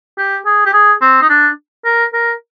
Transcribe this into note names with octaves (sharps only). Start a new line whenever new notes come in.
G4
G#4
G4
G#4
C4
D#4
D4
A#4
A#4